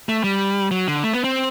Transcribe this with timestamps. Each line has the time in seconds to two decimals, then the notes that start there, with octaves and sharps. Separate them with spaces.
0.09 A3
0.24 G3
0.71 F#3
0.88 D3
1.04 A3
1.13 B3
1.24 C4